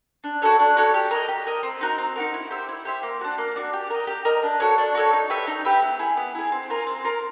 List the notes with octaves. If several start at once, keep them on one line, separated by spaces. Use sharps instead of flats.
D4
F#4 A4 C#5
D4
F#4 A4 C#5
G4
A#4 D#5
G4
A#4 D#5
C4
D#4 F#4 A#4
C4
D#4 F#4 A#4
E4
G4 C5 E5
E4
G4 C5 E5
A#3
D4 F#4
A#3
D4 F#4
G4
A#4 D#5
G4
A#4 D#5
D4
F#4 A4 C#5
D4
F#4 A4 C#5
D#4
G4 B4 E5
D#4
G4 B4 E5
B3
E4 G#4
B3
E4 G#4
C4
F4 A#4
C4
F4 A#4